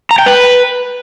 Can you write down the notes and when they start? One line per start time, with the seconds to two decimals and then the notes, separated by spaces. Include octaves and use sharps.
0.11 A#5
0.19 G5
0.26 B4